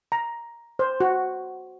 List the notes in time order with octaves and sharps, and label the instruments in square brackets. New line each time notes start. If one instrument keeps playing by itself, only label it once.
[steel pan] A#5
C5
F#4